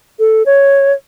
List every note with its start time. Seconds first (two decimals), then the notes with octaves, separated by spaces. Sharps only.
0.19 A4
0.46 C#5